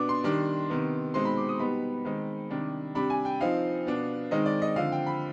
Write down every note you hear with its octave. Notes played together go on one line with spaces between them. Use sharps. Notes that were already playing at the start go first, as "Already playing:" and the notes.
Already playing: B2 B3 D4 D6
C6
D#3 G3 D4
C3 D#3 B3
B2 G#3 C4 D#4 C6
B5
D6
D#6
B2 G3 B3 D#4 B5
D#3 G#3 C4 D#4
C3 D#3 G3 D4
C3 G3 D4 B5
G#5
G5
F3 C4 D#4 F5
B2 B3 D4
D#3 G#3 C4 D#4 D#5
D5
D#5
D3 F3 C4 F5
G5
B5